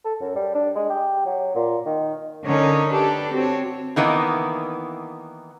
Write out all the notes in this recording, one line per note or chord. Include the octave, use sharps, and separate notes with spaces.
A4
F#2
G3
D4
G#3
G4
F#3
A#2
D#3
D3 C#4 D#4 A#4 C#5
D4 G4 A4 B4
C4 F#4 C#5
D#3 E3 A#3 B3